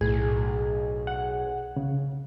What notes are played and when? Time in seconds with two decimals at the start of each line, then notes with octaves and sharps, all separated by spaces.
0.01 B1 A2 G#4
1.07 F#5
1.76 C#3